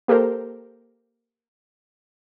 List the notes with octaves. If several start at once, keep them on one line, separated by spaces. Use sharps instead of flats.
A#3 G4 A4 A#4 C5